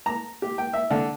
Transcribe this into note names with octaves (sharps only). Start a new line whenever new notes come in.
A#5
G4
G5
E5
D3